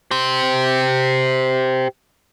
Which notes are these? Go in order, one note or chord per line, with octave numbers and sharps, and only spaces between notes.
G4 C5